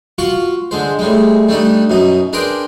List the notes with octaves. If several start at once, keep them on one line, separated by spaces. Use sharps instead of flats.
F4 F#4 F#5 C#6
D3 G#3 C5
A2 G3 G#3
G3 A3 D4 D#4
F#2 B2 D#4
D4 G#4 A#4 B4 G5 C6